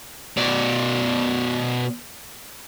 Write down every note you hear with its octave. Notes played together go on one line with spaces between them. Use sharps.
B2 D5